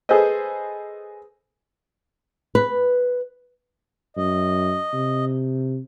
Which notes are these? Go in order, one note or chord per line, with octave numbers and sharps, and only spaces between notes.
G#4 A4 B4 C5 D#5
B4
F#2 D#5
C3